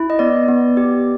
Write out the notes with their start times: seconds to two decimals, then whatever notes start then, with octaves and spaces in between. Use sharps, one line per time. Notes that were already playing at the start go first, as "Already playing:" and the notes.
Already playing: E4
0.10 D#5
0.19 B3 D5
0.48 B3
0.77 G4